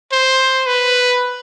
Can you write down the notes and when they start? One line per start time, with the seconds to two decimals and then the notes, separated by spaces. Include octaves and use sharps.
0.12 C5
0.67 B4